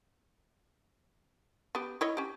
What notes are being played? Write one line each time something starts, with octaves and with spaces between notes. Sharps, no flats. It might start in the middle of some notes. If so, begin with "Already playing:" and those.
B3 G4
E4 C#5 D#5
C#4 G4